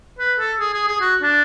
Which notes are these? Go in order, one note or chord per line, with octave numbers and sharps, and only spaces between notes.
B4
A4
G#4
G#4
G#4
F#4
D4